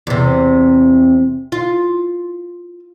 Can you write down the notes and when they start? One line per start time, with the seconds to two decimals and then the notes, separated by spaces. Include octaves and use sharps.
0.07 E2 C3
1.52 F4